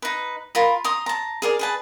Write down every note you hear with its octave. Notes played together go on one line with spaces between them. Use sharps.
D#4 B4
F4 A#4 B5
A#5 C6 D#6
A5 A#5
G#4 A#4 D5
G#4 B4 A5